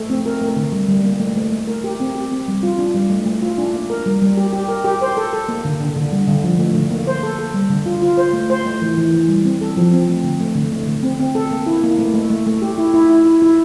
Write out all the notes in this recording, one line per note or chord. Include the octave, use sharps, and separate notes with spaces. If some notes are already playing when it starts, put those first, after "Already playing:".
Already playing: A3
C4
A#4
A3
D3
G3
G3
A#3
A3
A3
A3
A#4
G4
C4
G4
C4
G3
F4
D4
G3
A3
A3
F4
D4
A#3
A#4
G3
G3
G4
G4
A#4
G4
C5
A4
A4
A#3
D3
D3
D3
G3
D3
F3
A3
D3
A#3
C5
A4
A4
G3
D3
F4
F4
C5
A3
C5
A3
E3
E3
E3
G3
C4
A4
F3
C4
A3
D3
A3
D3
A3
D3
C4
C4
A4
A#3
E4
A#3
A3
A3
A3
A3
G4
E4
E4
E4
E4
E4